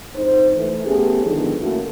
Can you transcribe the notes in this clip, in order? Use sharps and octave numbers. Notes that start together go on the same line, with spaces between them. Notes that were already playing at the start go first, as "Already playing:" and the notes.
F2 G#2 D#4 C5
E3 A3
A3 B3 C#4 G4 G#4
D3 D#3 F3 G#3 B3 D#4
A3 A#3 C#4 E4 F#4